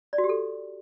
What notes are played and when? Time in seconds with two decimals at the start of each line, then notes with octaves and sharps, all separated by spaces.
0.13 D5
0.18 F#4
0.24 G4
0.29 A4